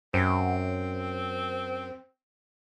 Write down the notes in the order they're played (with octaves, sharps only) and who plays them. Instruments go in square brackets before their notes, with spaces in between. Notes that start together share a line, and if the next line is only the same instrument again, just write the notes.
[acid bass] F#2 [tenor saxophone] C4